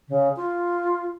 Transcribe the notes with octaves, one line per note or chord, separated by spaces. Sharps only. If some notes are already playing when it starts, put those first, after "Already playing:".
C#3
F4